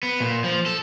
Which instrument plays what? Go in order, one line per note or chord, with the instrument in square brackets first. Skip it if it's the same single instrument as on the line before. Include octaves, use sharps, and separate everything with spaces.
[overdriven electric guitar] B3
A#2
F3
A4